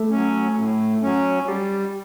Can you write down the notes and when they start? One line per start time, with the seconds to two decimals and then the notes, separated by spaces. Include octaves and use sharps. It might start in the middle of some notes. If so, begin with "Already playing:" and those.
Already playing: A3 A4
0.11 F#3 C#4
0.57 A2
1.02 F#3 C#4
1.48 G3 G4